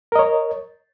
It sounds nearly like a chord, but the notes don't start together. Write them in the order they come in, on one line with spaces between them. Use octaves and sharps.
A#4 D#5 C#5